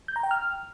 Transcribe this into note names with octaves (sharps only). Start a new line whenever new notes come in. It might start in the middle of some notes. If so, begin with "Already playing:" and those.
G6
A#5
G5
F6